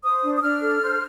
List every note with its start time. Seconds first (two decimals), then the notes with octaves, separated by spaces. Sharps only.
0.03 C5 D#6
0.23 D4
0.37 D#6
0.42 D4 F6
0.62 A4
0.81 C5